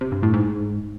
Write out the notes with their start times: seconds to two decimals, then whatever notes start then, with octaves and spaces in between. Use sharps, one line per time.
0.01 C3
0.12 G2
0.23 A2
0.34 G#2